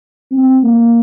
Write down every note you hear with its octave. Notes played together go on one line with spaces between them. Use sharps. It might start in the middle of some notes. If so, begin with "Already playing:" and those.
C4
A#3